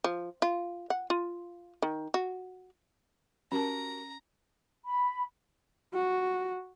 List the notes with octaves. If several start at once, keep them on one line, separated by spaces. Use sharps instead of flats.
F3
F4
F#5
F4
D#3
F#4
C#4 F#4 G4 A#4 A5 A#5
B5
F#4